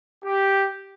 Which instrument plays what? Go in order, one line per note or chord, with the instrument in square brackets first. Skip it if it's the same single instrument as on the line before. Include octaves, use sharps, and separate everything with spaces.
[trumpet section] G4